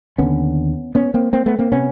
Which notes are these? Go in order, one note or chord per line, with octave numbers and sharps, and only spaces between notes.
D#2 D3 B3 C#4
B3 C#4
A#3 C4
A#3 C4
A3 B3
A#3 C4
C3 B3 C#4